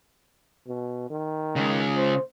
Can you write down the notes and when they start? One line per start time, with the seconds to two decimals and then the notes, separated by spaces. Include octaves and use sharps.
0.67 B2
1.10 D#3
1.56 C#3 G#3
1.96 C5